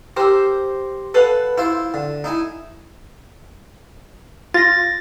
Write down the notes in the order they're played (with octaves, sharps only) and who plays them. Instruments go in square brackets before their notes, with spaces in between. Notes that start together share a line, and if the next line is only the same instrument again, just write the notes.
[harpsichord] G4 A#4 [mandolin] C5 E6
[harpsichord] A4 [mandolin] B4 F5 F#5
[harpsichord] E4 F4 C5 [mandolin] E6
[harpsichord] D3
D#4 E4 G#5
[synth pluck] F4 [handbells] A6 A#6